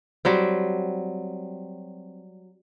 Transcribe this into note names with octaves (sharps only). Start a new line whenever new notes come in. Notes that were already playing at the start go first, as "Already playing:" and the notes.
F#3 G3 C4